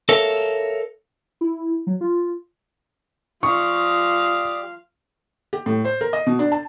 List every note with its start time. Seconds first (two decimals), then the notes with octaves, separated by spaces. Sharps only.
0.09 A4 A#4 C#5 E5 F5 A5
1.41 E4
1.87 F#3
2.01 F4
3.43 F3 G4 D5 F5 C#6 D#6
5.53 G4
5.66 A2
5.85 C5
6.01 A#4
6.13 D#5
6.27 B2
6.39 D4
6.52 A5